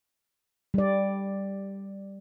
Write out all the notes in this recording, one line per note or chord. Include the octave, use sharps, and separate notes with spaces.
G3 D5